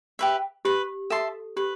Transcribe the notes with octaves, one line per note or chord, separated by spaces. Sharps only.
G4 B4 E5
G4 B4
A4 E5 A5 C6
G4 B4